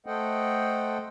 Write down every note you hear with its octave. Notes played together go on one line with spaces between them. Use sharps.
A3 A4 C5 D#5 F#5 G5